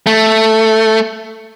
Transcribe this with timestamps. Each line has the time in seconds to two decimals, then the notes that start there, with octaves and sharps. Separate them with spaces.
0.07 A3